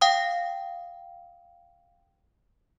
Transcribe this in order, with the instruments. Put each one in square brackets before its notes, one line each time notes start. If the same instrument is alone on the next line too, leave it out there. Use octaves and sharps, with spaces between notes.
[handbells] F5 G5 D#6